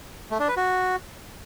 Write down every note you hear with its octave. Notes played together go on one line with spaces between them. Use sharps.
A3
D4
B4
F#4